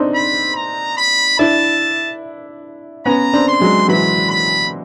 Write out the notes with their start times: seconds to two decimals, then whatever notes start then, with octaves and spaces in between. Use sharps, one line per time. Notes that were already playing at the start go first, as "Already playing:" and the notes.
Already playing: C4 D4 D#4
0.15 B5
0.56 A#5
0.97 B5
1.39 D4 E4 A5
3.06 B3 C#4 A#5
3.33 C4 D4
3.48 C6
3.61 F#3 G#3
3.88 E3 F#3 B5
4.30 B5